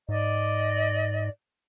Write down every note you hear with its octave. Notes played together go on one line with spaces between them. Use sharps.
G#2 D5 D#5